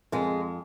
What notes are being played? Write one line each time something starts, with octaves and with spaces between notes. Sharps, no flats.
F2 G#3